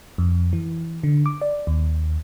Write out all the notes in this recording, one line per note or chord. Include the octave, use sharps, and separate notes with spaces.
F2
E3
D3
D6
D5
D#2